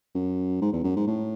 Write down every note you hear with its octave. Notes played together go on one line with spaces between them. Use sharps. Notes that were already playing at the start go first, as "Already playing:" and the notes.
F#2
G#2
E2
F#2
G#2
A2